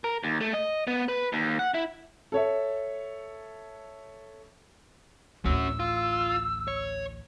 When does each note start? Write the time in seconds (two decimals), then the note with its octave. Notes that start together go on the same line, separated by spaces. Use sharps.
0.04 A#4
0.24 D#2
0.41 A3
0.54 D#5
0.87 B3
1.08 B4
1.33 D#2
1.59 F#5
1.74 E4
2.32 A4 C#5 E5
5.45 A1 D2 C#4 F#4 E6
5.80 F4
6.68 C#5